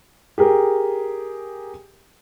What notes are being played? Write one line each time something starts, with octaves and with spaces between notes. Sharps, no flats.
G4 G#4 A#4